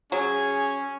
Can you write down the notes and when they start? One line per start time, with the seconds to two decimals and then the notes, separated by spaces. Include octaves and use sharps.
0.12 F#3 C#4 G#4